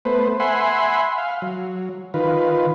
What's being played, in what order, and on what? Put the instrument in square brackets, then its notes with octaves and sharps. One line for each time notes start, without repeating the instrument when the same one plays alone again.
[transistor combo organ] A3 B3 B4 C5
E5 F#5 G#5 B5 C6
F5
F#3
D#3 F4 B4